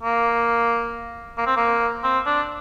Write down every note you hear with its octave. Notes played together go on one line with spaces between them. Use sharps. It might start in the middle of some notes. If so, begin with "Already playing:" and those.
A#3
A#3
C4
A#3
C4
D4